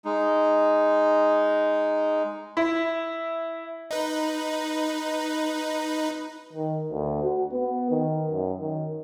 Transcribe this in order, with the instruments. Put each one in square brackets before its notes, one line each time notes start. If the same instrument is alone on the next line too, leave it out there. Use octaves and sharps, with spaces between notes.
[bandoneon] G#3 D#4
[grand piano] E4
[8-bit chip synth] D#4 B4
[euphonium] D#3
D2
F#4
B3
D#3
F#2
D#3